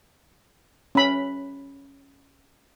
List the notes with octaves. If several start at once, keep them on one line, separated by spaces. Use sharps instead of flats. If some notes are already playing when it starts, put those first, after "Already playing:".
C#4 B5